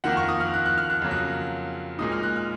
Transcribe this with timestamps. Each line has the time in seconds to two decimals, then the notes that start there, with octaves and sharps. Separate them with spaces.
0.04 F2 D#3 A#3 F#5
0.17 C#6
0.28 D#6
0.40 F6
0.54 F#6
0.66 F#6
0.78 F6
0.90 F#6
1.02 F2 C#3 F#3 A#3
1.11 F#6
1.99 A#2 G#3 D#4 D#6
2.12 F6
2.23 F#6
2.36 F6